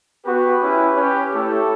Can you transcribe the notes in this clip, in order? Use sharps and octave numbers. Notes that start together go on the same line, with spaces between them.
B3 F#4 G4 B4
C#4 E4 G4
C#4 G4
A3 E4 G4 A4 C#5